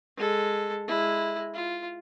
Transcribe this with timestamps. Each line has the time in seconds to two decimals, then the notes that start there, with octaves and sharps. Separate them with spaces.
0.16 G#3 A4
0.88 G#3 E4
1.54 F4